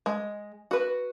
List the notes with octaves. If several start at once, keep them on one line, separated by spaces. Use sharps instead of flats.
G#3
F#4 B4